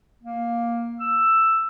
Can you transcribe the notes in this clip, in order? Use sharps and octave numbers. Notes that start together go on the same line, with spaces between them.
A#3
E6